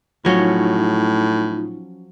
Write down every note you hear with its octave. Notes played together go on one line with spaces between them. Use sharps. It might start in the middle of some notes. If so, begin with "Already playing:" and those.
A2 F3 F#3 C#4 D#4 F4